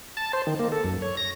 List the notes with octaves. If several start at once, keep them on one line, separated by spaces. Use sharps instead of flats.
A5
C5
D#3
A#3
A4
F#2
C#5
A#6